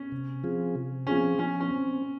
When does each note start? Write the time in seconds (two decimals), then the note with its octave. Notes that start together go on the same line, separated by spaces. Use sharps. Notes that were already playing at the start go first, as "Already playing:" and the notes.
Already playing: C#4
0.12 C3
0.44 F3 C4 F4 G#4
0.75 C3
1.07 F3 C4 C#4 F4 G#4
1.39 F3 C#4
1.60 C#4
1.70 C4